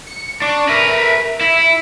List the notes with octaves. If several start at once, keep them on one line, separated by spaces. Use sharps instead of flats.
C#7
D4 C#6
A#4 B4 E5
E4 E5